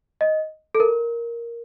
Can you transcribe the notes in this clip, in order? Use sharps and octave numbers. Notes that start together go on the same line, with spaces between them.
D#5
A4
A#4